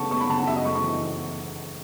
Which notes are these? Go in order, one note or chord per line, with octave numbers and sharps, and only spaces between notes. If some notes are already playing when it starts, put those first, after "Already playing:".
Already playing: C#3 A3 B3 A5 C#6
B3 C#6
B5
C#3 A5
F#5
F#2 E5
D#5
A3 C#6
C#6
E3